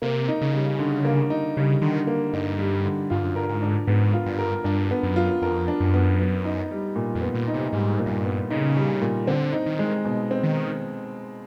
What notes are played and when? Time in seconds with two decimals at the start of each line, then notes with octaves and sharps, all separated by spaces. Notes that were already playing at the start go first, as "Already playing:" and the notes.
0.02 C3 A#3
0.28 D#4
0.41 C#3
0.53 G3
0.79 D3
1.05 A#3
1.30 D#4
1.57 C#3 G3
1.82 D3 D#3
2.07 A#3
2.33 G2 D#4
2.59 G3
2.85 D3
3.10 G2 F4
3.23 F#2
3.36 G2 A#4
3.49 G#2
3.62 D4
3.87 G#2 B3
4.13 F4
4.26 G2
4.39 A#4
4.64 G2 D4
4.91 B3
5.03 F#2
5.16 F4
5.42 F2 A#4
5.68 D4
5.80 F#2
5.94 B3
6.19 B3
6.45 D#4
6.71 G3
6.96 A#2
7.15 F2
7.22 B3
7.35 A#2
7.48 D#4
7.54 C3
7.73 G#2 G3
7.99 A#2
8.06 F#2
8.12 G2
8.25 B3
8.50 C#3 D#4
8.77 G3
9.02 A#2
9.27 D3 C4
9.53 D#4
9.66 D#3
9.79 G#3
10.05 B2
10.31 C4
10.43 D#3